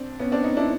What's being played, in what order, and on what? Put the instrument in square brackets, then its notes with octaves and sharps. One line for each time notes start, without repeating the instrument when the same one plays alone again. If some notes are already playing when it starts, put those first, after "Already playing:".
Already playing: [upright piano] C4 D4
B3 C#4
C4 D4
C#4 D#4
D4 E4